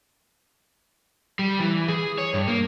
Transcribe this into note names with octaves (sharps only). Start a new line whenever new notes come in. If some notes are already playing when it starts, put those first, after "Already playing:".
G3
E3
G#4
C#5
G2
A#3